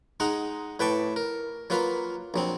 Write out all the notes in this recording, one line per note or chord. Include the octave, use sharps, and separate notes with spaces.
G#3 D#4 F#5 A#5
A2 B4 G5 A5 C#6 D6
A#4
F#3 A#3 F4 B4
A#1 F#3 C4